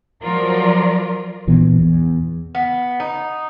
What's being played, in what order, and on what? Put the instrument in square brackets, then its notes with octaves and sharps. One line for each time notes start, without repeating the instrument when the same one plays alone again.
[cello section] F3 F#3 F4 A#4 D5
[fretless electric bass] A#1 A#2 E3 B3
E2
[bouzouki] B3
D#4